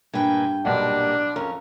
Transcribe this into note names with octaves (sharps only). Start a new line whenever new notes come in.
G2 A#2 B4 G5 G#5
B1 A#2 G3 D4 F#5
F2 C#4 A#4